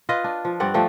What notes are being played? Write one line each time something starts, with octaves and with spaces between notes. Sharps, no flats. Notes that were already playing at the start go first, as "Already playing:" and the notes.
F4 B4 D#5
D4
F3
G2 C4 D5 F#5
F3 A3 D4 G5